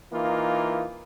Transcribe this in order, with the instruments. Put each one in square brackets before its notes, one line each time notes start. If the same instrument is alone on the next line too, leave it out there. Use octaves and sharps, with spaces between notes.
[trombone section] E3 A#3 D#4 F4